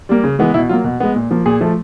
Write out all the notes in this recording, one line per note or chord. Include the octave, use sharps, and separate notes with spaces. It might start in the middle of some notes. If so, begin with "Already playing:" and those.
G3 A#3
C#3
E3 G#3 B3
B2 E4
F#3 A#3 F4
B2
G#3 B3
A#2
F3 A#3
A#2 G#4
F3 A3